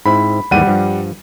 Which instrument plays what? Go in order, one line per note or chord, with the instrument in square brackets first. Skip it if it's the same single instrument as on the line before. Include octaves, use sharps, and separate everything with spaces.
[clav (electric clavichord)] G#2 C4 E4 [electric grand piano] B5
[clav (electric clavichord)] D#2 G#2 E3 [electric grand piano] G3 F#5 D#7
[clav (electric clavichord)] G2 F3